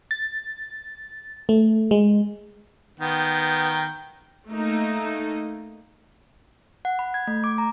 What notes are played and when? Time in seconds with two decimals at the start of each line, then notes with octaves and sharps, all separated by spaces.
0.11 A6
1.49 A3
1.91 G#3
3.00 D#3 B3 G5
4.48 A3 A#3 D#4
6.85 F#5
6.99 B5
7.14 G#6
7.27 A3
7.44 D6
7.58 A#5